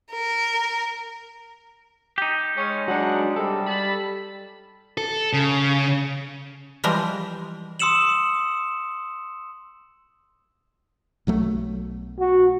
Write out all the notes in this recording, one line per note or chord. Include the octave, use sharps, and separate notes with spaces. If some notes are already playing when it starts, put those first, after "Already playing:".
A#4
D#4 G4
G#3 C#4
F#3 D4 F#5
C3 G3 A4
A5 B5
A4
C#3
E3 F3 G3 G#3 A#4
C6 D#6 E6 C#7 E7 F#7
B1 F#3 A3
F#4